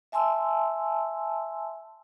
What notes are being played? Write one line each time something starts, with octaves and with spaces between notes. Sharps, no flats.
E5 G#5 A5 C6 E6